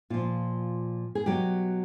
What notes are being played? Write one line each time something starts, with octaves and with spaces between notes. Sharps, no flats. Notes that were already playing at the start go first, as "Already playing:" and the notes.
A#2 F3 F4
G#4
B2 F#3 G4